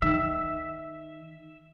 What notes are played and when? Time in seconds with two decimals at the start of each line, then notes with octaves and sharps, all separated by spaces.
0.02 D#3 E5